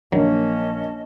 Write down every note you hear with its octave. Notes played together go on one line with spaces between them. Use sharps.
A#1 D#3 F#3 A#3 C#4 D#5 A5